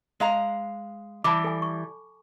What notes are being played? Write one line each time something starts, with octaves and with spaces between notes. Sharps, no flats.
G#3 F5 A#5
E3 G3 A5 B5 D6
A4 G#5
C#6